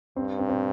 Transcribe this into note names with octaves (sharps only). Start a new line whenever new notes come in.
G2 C4
C4
C4